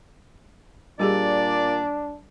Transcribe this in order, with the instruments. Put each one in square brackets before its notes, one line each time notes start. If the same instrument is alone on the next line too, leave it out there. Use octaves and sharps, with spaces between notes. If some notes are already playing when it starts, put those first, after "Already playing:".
[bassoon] A#2 [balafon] G3 G4 G#4 [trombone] D4 [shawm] D5